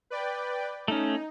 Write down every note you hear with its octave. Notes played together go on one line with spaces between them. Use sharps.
B4 D5 G5
A3 C#4 D#4